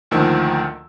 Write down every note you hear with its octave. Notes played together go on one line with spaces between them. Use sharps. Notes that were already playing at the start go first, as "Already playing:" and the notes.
D2 A#2 D#3 F3 E6